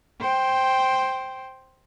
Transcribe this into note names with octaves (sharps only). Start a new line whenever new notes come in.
C5 G5